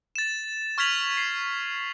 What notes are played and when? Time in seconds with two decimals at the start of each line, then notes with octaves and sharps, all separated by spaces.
0.16 A6 E7
0.78 C#6 F6 G#6 B6 F7 F#7
1.17 C7